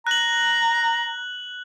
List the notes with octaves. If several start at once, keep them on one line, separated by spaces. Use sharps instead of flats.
A#5 F#6 F#7